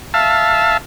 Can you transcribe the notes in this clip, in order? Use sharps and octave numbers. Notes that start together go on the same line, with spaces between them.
E5 F5 A5